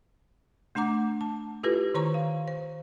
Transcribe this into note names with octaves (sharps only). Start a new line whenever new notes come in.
A3 D4 F#5 A#5 D6
A5
E4 F4 G4 A4 B4
D#3 C5 A#5 C#6
F5
C5